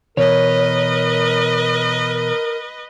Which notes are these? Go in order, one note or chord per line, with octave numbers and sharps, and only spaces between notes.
B2 E3 A#4 B4 C#5 D#5